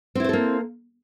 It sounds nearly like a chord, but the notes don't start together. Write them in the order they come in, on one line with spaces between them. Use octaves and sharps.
C4 E4 C5 A4 A#3